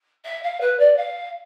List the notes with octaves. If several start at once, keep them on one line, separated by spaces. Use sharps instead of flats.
E5
F5
B4
D5
F5